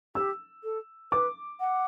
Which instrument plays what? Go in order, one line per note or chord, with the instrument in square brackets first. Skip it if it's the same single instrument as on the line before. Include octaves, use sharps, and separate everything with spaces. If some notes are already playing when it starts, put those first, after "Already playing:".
[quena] G4 [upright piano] E6
[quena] A4
[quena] B4 [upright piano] D6
[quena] F#5